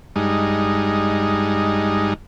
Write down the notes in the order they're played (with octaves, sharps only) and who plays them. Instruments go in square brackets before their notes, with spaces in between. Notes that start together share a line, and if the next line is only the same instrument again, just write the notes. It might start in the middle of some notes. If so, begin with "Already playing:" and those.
[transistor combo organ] G2 G#3 D#4